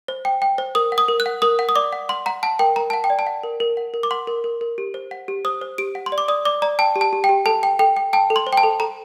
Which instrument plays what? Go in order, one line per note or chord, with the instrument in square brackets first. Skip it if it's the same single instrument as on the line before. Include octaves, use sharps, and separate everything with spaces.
[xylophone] C5
G5
G5
C5
A#4 D#6
F#5
D#6
A#4
F#6
F#5
A#4 D#6
F#5
D#6
D5 D6
F#5
F#5 C6
F#5 A#5
F#5 A5
A#4 G5
A#4 A#5
F#5 A5
G5
D5
A5
F#5
A#4
A#4
F#5
A#4
D6
F#5 C6
A#4
A#4
A#4
G4
C5
F#5
G4
C5 D#6
C5
G4 D7
F#5
C6
D5
D6
D5 D#6
D5 D6
D5 A#5
G5 A5
G4
A5
G4
G5
G4
A4 A5
G5
A4 G5
G5
G5 A5
A4
C6
C5
G5
A5
A4
A4 A#5